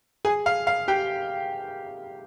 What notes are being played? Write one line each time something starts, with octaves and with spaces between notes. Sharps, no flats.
G#4 G#5
F5
F5
G4 G5